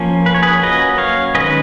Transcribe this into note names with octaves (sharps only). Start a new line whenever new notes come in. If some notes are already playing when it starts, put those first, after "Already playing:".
Already playing: F3 A#3 C#4
B4
C#5
G#4 B4
F#3 A#3 C#4 B4 D#5
C#5 F5
D#3 G#3 C#4 B4 D#5